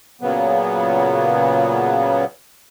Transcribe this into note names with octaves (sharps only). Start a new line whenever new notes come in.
A#2 C#3 F#3 B3